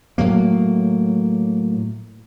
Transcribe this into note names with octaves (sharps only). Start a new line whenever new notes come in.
A2 F#3 A#3